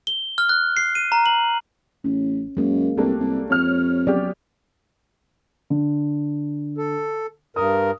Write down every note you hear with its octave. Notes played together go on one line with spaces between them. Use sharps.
G7
F6
F#6
C7
D#7
A#5
F#7
A1 C#4
F#2 G#3 A#3
C2 A3 A#3 D4 G4
C2
F2 C#5 F6
F#3 B3 C#4 G4 D5
D3
A4
G2 A#4 D#6